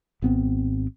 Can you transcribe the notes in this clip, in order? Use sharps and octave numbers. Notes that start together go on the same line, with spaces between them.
G#1 B3 C4